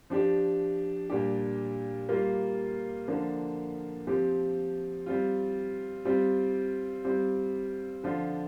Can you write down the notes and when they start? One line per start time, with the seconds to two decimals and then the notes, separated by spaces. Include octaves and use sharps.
0.10 F3 D4 G4
1.10 A#2 G3 D4 G4
2.09 G3 A#3 F4
3.08 D3 F3 A#3 D4
4.07 F3 C4 G4
5.06 G3 C4 F4
6.05 G3 C4 F4
7.04 G3 C4 F4
8.04 D3 F3 D4 F4